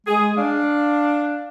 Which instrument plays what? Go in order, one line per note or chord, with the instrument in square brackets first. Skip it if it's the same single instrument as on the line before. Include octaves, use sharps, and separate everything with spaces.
[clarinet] G#3 [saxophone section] G#4
[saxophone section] D4 [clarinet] F5